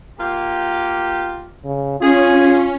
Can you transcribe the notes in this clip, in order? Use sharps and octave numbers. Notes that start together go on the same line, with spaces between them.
A#3 F4 G4
C#3
C#4 F4 G#4